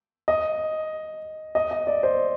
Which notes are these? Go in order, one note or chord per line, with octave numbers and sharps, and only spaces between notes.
D#5
D#5
D#5
D5
C5